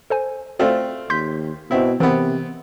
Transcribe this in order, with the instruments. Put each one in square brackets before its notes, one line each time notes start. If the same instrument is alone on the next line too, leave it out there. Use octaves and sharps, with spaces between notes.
[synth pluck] A4 C5 G#5
[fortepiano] A3 C4 F4 [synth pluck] F#4 A4 D5
[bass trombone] D#2 [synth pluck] C6 G6 B6
[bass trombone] B2 [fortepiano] C4 E4
[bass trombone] C3 [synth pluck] E3 A#4 [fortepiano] B3 C4